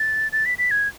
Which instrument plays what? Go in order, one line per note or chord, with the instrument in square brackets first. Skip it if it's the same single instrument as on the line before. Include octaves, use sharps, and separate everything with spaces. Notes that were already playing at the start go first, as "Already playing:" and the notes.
Already playing: [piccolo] A6
A6
B6
B6
G#6